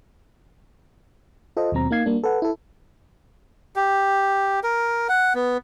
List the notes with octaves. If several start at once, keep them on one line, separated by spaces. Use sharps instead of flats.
F4 A4 C5 D#5
D#2 B2 F#3 C4 A#5
A#3 D#4 F5 G#6 C7
G3 A#3 D4
A4 B4 F#5
E4 A4
G4
A#4
F#5
B3